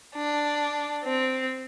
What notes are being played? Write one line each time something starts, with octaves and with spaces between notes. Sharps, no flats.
D4
C4